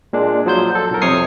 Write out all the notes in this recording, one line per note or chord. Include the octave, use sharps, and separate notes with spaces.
A#2 G#3 D4
F3 F#3 C5 G6
A4
B1 A#4
F2 C3 C#5 C#6 D#6 C7